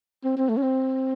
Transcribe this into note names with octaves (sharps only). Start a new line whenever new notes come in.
C4
C4
A3
C#4
C4